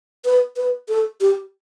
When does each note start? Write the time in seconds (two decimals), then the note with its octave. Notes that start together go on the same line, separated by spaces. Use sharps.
0.25 B4
0.56 B4
0.89 A4
1.21 G4